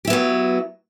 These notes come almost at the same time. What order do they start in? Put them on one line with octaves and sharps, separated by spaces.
G4 E4 B3 F#3